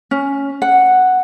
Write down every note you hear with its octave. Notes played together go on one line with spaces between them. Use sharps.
C#4
F#5